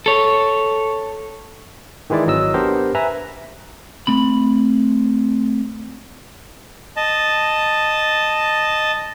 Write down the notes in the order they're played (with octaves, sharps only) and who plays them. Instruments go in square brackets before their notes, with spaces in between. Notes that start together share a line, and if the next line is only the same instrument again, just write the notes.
[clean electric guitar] A4 C#5
[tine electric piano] D#3 E3 G#3 E4 D5
G#1 F#3 D#5 E6
B3 D4 G4 A#4 C5
B4 E5 G#5 A#5
[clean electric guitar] A3 C4 B5
[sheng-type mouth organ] D#5 A5